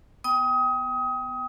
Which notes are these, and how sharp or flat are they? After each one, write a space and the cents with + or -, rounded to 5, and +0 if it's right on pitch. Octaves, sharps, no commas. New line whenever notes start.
B3 +0 G5 +0 D#6 +25